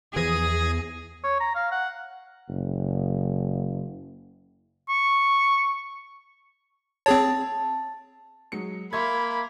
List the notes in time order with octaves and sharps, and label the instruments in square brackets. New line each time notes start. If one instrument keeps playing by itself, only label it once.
[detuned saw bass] E2 [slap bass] E3 F3 [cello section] G#4 [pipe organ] D#6 G#6 A#6
[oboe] C#5
A#5
F5
F#5
[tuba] F#1
[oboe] C#6
[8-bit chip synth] C4 G#4 C#5 [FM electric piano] A5
[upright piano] F#3 G#3 C#7
[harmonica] A#3 [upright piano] E5 C6 G#6 [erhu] B5